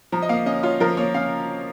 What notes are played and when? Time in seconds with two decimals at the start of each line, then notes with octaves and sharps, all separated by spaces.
0.12 F3 A#5
0.22 D#5
0.29 A#3 F5
0.46 C#4 D#5
0.63 F4 C#5
0.80 F3 A#4
0.97 A#3 C#5
1.14 C#4 F5